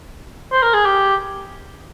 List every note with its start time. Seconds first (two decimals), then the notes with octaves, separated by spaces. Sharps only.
0.51 C5
0.63 A#4
0.74 G#4
0.85 G4